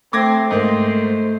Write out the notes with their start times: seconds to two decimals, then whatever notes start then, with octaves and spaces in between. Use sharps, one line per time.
0.13 A3 C4 D6 G#6 A#6
0.51 G#2 A#3 C5